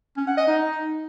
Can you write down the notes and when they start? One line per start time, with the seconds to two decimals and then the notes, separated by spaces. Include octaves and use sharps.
0.17 C#4
0.27 F#5
0.37 D#5
0.47 D#4